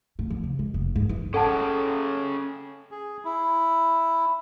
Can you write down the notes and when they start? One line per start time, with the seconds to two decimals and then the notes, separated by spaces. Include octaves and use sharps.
0.19 A2
0.30 F2
0.44 C#3
0.59 G#3
0.74 F1
0.96 G#2
1.09 E3
1.34 C#4 G#4 A4 F#5 G5 A5
2.91 G#4
3.25 E4